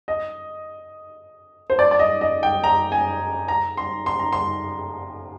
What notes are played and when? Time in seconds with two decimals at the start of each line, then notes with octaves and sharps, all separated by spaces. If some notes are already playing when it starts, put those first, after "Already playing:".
0.08 D#5
1.70 C5
1.79 D5
1.91 D5
1.99 D#5
2.21 D#5
2.43 G5
2.64 A#5
2.92 G#5
3.48 A#5
3.77 C6
4.06 C6
4.19 A#5
4.32 C6